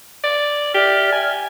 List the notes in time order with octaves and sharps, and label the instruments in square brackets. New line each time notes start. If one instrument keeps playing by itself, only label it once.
[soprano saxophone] D5
[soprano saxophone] G4 [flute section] D5 E5 F6
[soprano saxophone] G#5